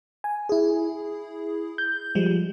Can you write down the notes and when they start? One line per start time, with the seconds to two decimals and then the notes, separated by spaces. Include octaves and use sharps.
0.24 G#5
0.49 E4 G#4
1.78 G6
2.15 F3 G3 G#3